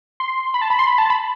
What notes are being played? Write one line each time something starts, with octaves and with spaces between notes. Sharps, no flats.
C6
B5
A5
B5
C6
B5
A5
B5